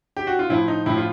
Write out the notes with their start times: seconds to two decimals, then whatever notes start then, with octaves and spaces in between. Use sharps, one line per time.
0.17 G4
0.27 F#4
0.39 F4
0.49 A2 F3 E4
0.68 D#4
0.86 A2 F3 E4
0.98 F4